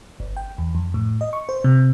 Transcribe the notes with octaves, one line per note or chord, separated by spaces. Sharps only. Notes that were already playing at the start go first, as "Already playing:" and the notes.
G1
G5
E2
F2
A2
D#5
C#6
C5
C3